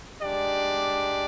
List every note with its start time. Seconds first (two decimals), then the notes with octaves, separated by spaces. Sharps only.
0.21 G#3 D4 G4 D5